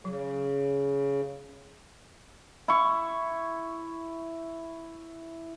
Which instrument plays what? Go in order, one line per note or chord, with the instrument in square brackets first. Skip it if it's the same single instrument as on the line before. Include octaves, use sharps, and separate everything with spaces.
[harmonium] C#3 [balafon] F#3
[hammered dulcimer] E4 C#6